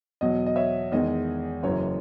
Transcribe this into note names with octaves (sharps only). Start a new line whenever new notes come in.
E2 B2 F#3 D#5
D#5
C#5 E5
E2 D#3 G#3 D#5
F#1 F#2 E3 C#5